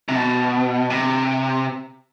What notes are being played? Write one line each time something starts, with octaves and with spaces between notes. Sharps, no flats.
C3
B2
C3